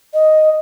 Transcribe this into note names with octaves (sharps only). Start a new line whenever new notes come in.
D#5